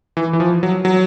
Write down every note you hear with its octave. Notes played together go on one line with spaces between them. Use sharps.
E3
E3
F3
F#3
F#3